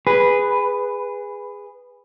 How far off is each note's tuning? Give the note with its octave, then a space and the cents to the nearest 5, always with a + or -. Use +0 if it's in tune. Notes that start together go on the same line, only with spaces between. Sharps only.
G#4 -15 B4 +0